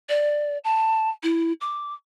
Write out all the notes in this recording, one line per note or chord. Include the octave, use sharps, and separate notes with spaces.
D5
A5
E4
D6